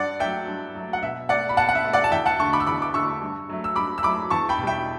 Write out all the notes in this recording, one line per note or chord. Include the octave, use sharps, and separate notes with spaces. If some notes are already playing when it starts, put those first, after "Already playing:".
Already playing: G2 D5 F#5
F#3 A3 E5 G5
G2
F#3 A3
F#5
B2 E5
A3 D5 F#5
B5
B2 F#5 A5
F#5
E5
A3
D5 F#5
A5
E2 E5 G5
F#5 A5
D3 A3 A5 C#6
B5 D6
E6
E2 B5 D6
D6
D3 A3 C#6 E6
G2
F#3 A3
E6
G2 B5 D6
E6
F#3 A3 B5 D6
E2 A5 C#6
G5 B5
B2
G3 E5 G5